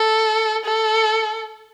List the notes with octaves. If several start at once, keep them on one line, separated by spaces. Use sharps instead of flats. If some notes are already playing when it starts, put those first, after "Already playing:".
Already playing: A4
A4